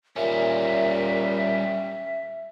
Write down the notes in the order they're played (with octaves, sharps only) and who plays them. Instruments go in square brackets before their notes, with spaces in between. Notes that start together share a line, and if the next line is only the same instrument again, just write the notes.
[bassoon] A#2 [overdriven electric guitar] G3 C#4 [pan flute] E5